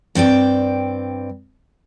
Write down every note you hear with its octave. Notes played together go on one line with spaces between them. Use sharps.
G2 C4 D5 G5